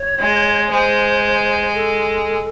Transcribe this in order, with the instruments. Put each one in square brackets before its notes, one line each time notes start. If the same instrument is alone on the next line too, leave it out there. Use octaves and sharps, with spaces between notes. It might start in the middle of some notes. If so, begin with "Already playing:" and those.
Already playing: [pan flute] C#5
[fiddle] G#3
[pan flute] C#5
[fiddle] G#3 [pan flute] C5
[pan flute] A4